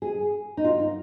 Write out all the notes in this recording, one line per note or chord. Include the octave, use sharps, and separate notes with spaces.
G#4
D#4
F4
D#4